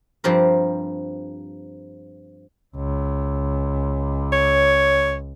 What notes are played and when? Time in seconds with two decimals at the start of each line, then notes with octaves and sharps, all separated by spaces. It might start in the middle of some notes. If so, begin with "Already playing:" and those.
0.24 G2 F3 C4 G4 A#4
2.76 C#2
4.33 C#5